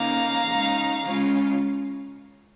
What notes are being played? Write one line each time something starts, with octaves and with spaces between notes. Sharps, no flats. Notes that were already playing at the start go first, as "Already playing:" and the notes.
Already playing: C#3 A#3 D#4 F5 A#5
C#3 G#3 D#4
C#3 G#3 C#4 F4